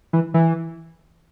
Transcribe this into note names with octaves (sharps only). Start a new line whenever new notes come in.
E3
E3